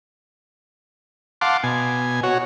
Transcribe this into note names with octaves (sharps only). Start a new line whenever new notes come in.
F5 F#5 A5 C6 D6
B2 G#5
F#4 C#5